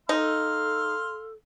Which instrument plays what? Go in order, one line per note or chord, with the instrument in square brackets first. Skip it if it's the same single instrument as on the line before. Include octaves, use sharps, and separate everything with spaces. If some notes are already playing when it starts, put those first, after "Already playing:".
[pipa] D#4 [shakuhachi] A4 [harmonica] F5 C6